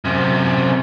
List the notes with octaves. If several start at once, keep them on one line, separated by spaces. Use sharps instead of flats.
F#2 C3